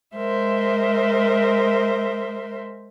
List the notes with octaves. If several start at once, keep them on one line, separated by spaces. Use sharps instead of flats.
G#3 A#4 C5 E5